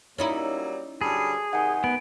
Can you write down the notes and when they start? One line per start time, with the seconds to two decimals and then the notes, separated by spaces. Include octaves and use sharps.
0.18 F#3 G3 A#3 C#4 D#4 E4
1.01 G2 D3 F#3 G#4
1.53 C3 D#3 D#4 F#5 G#5
1.84 B3 D7